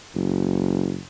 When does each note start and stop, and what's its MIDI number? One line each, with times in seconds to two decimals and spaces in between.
0.15 1.02 30